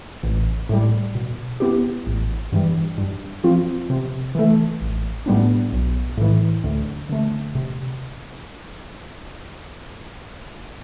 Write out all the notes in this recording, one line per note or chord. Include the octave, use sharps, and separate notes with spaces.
A1
A2 G3
B2
B3 E4 G4
A1
G2 E3 G3
G2
F3 C4 F4
C3
E3 A3
A1
A2 G3 B3 D4
B1
A2 E3
D2
D3 A3
C3